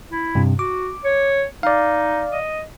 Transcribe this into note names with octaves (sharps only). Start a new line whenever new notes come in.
E4
G2 C3
F#4 D6
C#5
D#4 D5 F5
D#5